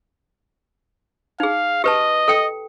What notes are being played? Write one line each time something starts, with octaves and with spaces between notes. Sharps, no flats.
D#4 G#4 F5
G4 B4 D#5 A5
A4 G5